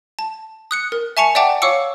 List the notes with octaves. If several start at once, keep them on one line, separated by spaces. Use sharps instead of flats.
A5
D#6 F#6 C#7
A#4
E5 G#5 A5 C#6 C#7 F7
D5 E5 F#5 G5 A5 D6
C#5 F5 C#6 D6 E6 C#7